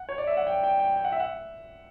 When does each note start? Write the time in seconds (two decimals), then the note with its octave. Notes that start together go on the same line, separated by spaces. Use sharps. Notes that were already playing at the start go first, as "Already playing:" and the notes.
Already playing: F#5
0.09 C#5
0.18 D5
0.27 E5
0.37 F#5
0.47 G5
0.63 G5
0.79 G5
0.96 G5
1.04 F#5
1.12 E5
1.20 F#5